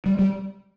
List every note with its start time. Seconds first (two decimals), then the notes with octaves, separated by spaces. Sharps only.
0.06 G3
0.19 G3